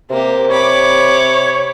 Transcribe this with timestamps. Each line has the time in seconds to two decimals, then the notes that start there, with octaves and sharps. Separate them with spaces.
0.10 C3 A#3 G4
0.52 C#5 B5 D6